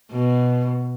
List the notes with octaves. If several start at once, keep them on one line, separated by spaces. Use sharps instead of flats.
B2